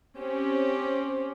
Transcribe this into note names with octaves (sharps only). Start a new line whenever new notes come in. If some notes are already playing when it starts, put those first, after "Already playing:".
C4 C#4 G4